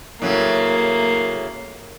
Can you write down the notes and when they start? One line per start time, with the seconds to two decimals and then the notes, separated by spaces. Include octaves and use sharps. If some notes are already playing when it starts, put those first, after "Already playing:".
0.22 A2 C#3 F#3 A#3